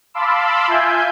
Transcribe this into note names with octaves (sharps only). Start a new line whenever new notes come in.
F5 A5 B5 C6 D6 E6
F4 E5 G#5 G6